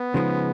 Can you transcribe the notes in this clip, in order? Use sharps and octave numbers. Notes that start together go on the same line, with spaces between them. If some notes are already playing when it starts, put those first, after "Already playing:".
Already playing: B3
C#3 F3 G#3 D#4